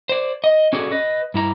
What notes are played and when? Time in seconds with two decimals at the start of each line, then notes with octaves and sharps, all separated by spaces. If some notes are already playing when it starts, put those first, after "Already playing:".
0.09 C5 D5
0.44 D#5
0.73 C#4 F#4 G#4 A4 C#5 D5
0.91 B4 D#5
1.34 G2 E4 A#5